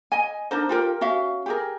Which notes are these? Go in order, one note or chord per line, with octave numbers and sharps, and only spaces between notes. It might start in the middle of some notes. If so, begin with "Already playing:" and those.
D#5 G#5
D4 D#4 A#4 C5
F4 G4 A#4
C#4 F#4 E5 F5
G4 G#4 A#4